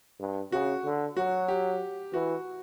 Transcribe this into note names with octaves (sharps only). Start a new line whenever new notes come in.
G2
C#3 F#4
D3
F#3 F#4
G4
E3 F#4